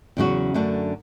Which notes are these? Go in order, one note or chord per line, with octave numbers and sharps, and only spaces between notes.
E2 C#3 F#3 C#4 F#4
F#2 D3 A3 D4 F#4